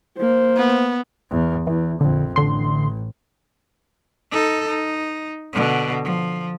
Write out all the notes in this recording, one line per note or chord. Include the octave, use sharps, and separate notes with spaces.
A#3 C5
B3
E2
E2 E3
A#1 F2 D3
A1 D3 C6
D#4 A4
D#4
B2 D3
F3